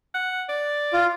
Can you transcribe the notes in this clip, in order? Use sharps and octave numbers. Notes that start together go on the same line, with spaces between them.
F#5
D5
F4